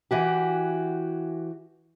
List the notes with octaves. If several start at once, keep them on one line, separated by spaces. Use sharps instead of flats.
E3 F#4 G4